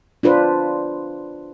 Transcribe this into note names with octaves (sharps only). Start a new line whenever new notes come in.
D4 F4 B4 C5